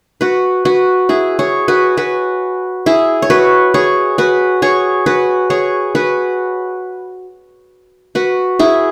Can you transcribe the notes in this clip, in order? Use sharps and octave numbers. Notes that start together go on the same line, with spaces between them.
F#4 B4
F#4 B4
E4 G#4
G#4 C#5
F#4 B4
F#4 B4
E4 G#4
C#5
F#4 B4
G#4 C#5
F#4 B4
G#4 C#5
F#4 B4
G#4 C#5
F#4 B4
F#4 B4
E4 G#4